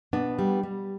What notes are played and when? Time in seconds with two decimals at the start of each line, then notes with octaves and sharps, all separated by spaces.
0.13 B2 B3 D4
0.39 G3
0.63 G3